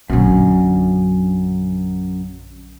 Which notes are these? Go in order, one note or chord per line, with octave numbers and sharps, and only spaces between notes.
A#1 F#2 D3